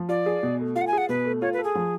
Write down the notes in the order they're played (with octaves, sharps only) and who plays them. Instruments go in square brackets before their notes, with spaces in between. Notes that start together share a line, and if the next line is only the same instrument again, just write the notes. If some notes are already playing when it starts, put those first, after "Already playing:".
Already playing: [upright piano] F3
[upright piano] F4 [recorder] D5
[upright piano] G#4
B2
A3
[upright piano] F4 [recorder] F5
[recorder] F#5
G#5
[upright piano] G#4 [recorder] F#5
[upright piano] B2 [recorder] B4
[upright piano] A3
[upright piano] F4 [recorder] C#5
[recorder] B4
[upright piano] A4
[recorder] G#4
[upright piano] F3